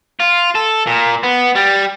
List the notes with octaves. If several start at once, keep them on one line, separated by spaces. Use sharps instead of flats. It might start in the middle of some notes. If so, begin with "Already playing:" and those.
F4
A4
A#2
B3
G3